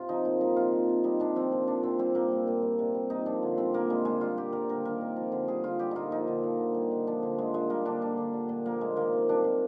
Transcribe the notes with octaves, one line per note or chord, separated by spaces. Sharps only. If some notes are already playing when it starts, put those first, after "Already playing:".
Already playing: C3 F4
F3 D#4
A#2
G3 D#4
C3 F4
F3
C3
G3 D#4
C3 D4
F3 C4
A#2
F3 D4
C3 C4
G3 C4
A#2 A#3
G3
A#2
G3
C3
G3
A#2 D#4
F3 D4
D3
G3 C4
A#2 A#3
G3 G#3
D3 G#3
G3 F4
A#2 G4
G3 A#4
D3 A#4
D#3 A#4
C3
F3
D3
G3 G#4
D3 F4
G3 G4
A#2 D#4 F4
F3 D#4
D3
F3
D3
G3
D3
F3 D4
D3
F3 G#3
A#2 G#3
G3 A#3
D3 D4
G3 D4
D3
G3
A#2
F3 A#3
A#2 G#3
D#3 A#3
C3
G3 D4
A#2